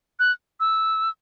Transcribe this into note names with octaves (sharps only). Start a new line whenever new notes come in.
F#6
E6